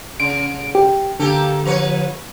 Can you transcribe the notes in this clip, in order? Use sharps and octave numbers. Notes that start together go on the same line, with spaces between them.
C#3 D7
G4
D3 A#3 G4 A4
F3 B4 C#5